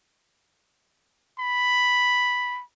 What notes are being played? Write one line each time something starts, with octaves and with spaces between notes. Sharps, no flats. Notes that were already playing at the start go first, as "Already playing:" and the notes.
B5